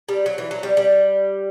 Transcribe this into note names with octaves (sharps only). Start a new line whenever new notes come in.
G3
F#3
E3
F#3
G3
G3